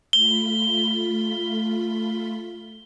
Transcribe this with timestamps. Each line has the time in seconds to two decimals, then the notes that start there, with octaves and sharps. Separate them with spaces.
0.13 A3 F4 B5 G7